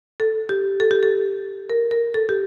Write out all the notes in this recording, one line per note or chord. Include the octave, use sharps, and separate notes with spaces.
A4
G4
A4
G4
A4
A#4
A#4
A4
G4